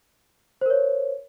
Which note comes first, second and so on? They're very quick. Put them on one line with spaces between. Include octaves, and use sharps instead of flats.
C5 A#4 C#5